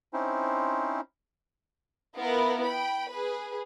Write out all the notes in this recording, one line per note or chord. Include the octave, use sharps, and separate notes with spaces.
C4 C#4 D#4 E4 C5
B3 E4 F4 A#4
G5 B5
G#4 B4